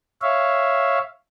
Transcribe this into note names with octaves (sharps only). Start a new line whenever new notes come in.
C#5 E5 F5